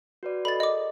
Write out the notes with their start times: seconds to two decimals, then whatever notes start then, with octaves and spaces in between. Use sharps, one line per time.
0.23 F#4 B4 D5
0.45 A4 D5 D#5 B5 A6
0.60 G#4 A#4 D#5 D6